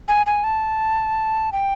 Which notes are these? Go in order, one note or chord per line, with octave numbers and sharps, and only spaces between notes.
G#5
G#5
A5
G5